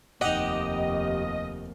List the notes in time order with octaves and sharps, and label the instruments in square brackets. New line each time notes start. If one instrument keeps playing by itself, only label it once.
[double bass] F1 D#2 [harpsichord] D#4 F#5 [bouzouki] G4 [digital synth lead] D#5